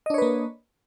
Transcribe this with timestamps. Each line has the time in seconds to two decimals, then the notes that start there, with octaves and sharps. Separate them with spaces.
0.06 D#5
0.10 D4
0.14 C#5
0.18 B4
0.22 A#3